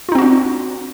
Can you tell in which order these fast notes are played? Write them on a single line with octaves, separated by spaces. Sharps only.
F4 D#4 C4 F#4 D4